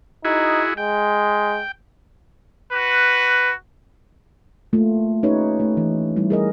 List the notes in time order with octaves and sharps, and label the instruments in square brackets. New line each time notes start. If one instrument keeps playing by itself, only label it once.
[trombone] D#4 [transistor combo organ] E4 F#4 G#4
[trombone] G#3 [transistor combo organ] G5
[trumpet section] F#4 B4
[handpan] A3 A#3 F4
C#4 D#4 G4 B4 C#5
A3
E3
G3 E4
G#4 A#4 D#5